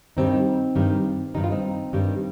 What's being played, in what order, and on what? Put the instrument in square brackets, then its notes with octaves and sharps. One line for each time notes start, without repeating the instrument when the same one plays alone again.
[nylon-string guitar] G2 D#3 G3 C4 D#4
G2 D#3 G3
G2 D#3 G3 D#4
F4
C4 D#4
G2 D#3 G3